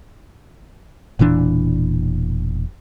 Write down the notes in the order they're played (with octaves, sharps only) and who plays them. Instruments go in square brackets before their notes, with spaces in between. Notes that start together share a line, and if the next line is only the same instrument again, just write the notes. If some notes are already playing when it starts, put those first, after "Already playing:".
[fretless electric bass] E1 A#2 E3 D4